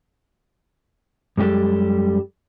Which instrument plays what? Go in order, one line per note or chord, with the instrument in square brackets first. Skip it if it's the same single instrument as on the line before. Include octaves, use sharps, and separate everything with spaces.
[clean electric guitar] F#2 G3 G#3 G4 A4